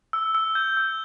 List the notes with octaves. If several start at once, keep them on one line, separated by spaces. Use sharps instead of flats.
E6
E6
G6
E6